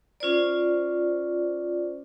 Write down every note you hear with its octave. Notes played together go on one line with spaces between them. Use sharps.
C#4 F4 C5 D5